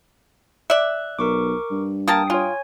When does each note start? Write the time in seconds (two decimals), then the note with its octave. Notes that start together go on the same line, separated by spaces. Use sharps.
0.70 D5 E5 F#6
1.19 B1 A#4 C#6 D6
1.71 G2
2.08 A#3 A#4 G5 A5 D#6
2.30 F4 C#5 G#5